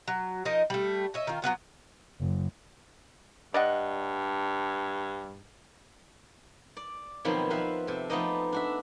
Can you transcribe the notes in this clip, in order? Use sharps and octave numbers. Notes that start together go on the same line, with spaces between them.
F#3
F3 D#4 A#4 D#5
G3 A3
C#5 D#5 E5
D#3 F4
F#3 G#3 B3 F4
F#1
G2 D5 D#5 F#5
D5
B2 D#3 F3 F#3 B3 C4
F3 F4 B4 E5 F5
C3 A4
F3 A3 B3 D#4 D5 D#5
D4 F#4 E5